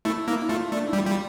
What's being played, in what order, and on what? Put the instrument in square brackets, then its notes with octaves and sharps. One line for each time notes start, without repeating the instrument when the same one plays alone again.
[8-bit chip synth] A3 [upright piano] E4
[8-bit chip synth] A#3 [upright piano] E4
[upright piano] E4
[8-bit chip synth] A3 [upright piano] F4
[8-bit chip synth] A3 [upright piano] D4
[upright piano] E4
[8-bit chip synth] G3
[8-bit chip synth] G3 [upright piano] F4